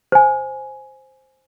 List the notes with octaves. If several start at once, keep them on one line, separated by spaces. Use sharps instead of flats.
C5 G#5